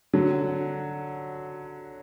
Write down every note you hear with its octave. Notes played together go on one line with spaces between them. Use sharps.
D3 F#3